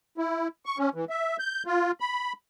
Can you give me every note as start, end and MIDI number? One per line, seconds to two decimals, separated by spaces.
0.18 0.48 64
0.66 0.78 85
0.78 0.89 61
0.95 1.05 52
1.10 1.37 76
1.39 1.63 91
1.66 1.91 65
2.00 2.33 83